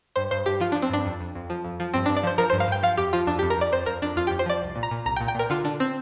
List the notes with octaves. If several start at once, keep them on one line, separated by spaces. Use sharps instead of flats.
G2 C5
G2 C5
G2 G4
F3 F4
F3 D4
C4
G2 D4
F2
F2
F2
F3
F2
F3
G2 C4
G2 D4
D5
F3 C5
F3 A#4
G2 C5
F5
G2 G5
F3 F5
F2 G4
F3 F4
F2 D4
F2 G4
A#4
F2 D5
F2 C5
F2 A#4
F2 D4
F2 F4
F2 G4
C5
F3 D5
C2
A#2
A#5
A#2
C2 A#5
G5
A#2
G5
A#2 A#4
D3 F4
D3 D4
C4